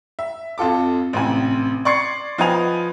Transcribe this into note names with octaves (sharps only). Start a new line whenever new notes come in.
E5
F2 F4 A4 D6
A1 C3 G#5
D5 C6 C#6 G#6 C7 C#7
F3 B3 D#5 G#5 F7